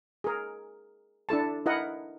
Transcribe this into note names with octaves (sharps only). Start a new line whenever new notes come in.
G#4 A#4
D4 E4 A4 A5
E4 A#4 D#5 F#5